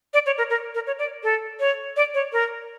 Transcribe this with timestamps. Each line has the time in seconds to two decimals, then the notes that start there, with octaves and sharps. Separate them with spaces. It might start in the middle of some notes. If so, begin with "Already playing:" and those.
0.14 D5
0.26 C#5
0.38 A#4
0.50 A#4
0.75 A#4
0.87 C#5
0.99 D5
1.24 A4
1.60 C#5
1.96 D5
2.14 C#5
2.33 A#4